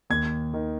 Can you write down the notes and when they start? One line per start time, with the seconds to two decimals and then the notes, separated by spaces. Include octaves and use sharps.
0.10 D#2 G#6
0.54 D#3